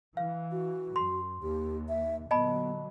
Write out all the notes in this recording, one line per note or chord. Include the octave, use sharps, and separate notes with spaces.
E3 F5
F#4
F#2 C6
D#2 G4
E5
A#2 D3 F#3 B3 D#5 A5 B5